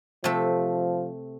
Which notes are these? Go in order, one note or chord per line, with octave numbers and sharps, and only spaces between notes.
C3 F3 A3